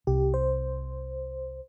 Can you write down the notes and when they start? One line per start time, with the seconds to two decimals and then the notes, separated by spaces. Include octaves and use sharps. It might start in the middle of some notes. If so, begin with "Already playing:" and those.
0.07 C2 G4
0.34 C5